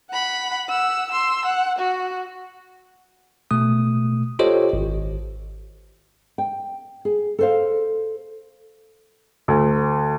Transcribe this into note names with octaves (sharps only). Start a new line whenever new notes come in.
F#5 B5
F#5 E6
C6 E6
F#5
F#4
B2 A3 D#6
F4 G4 A4 C5 C#5 D#5
G#1
G5
G#4
A4 C5 F5
D2